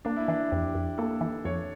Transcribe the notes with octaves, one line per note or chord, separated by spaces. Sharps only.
A#3 D4
E4
E3 D4
F2 G4
F2
A#3 A4
E3
F2 C#5